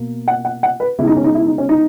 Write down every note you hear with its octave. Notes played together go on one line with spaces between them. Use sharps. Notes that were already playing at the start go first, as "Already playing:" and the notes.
Already playing: B2 A#3
F#5
F#5
F#5
B4
C#3 G#3 B3 E4
D#4
C#4
D#4
E4
D#4
C#4
D#4